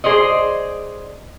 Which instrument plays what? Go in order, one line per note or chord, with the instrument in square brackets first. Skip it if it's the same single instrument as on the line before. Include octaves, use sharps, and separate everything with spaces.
[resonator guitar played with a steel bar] G#4 C5 D5 D#5